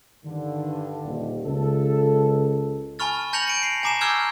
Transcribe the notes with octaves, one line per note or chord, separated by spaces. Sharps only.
G2 D3 D#3
D#1
C#2 A4
G#5 A5 B5 C#6 F6 A6
A5 G6 A#6 C#7 F7 F#7
C#7 D7
C7
G#5 A#5 D6 C7 E7
G#5 C#6 E6 F6 G6 G#6